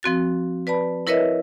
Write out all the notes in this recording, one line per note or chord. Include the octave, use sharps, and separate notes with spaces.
F3 C4 F#4 A6
B4 D5 A5 B5
E4 A#4 B4 C#5 D#5 E5